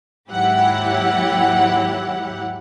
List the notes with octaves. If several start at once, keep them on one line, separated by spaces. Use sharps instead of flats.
D#2 G#2 F#3 E4 G4 F#5